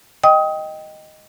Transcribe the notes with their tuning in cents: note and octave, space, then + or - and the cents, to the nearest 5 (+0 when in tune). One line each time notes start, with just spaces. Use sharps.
D#5 +0 G5 +0 D#6 +25